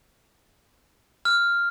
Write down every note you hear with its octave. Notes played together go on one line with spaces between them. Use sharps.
F6